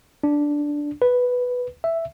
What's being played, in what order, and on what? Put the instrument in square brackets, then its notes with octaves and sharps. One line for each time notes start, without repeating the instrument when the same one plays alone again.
[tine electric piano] D4
B4
E5